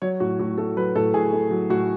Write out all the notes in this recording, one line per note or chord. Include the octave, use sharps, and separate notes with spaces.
F#3 C#5
A2 F#4
A2 F#4
A3 A4
F#3 B4
A2 A4
A2 G#4
A3
F#3
A2 F#4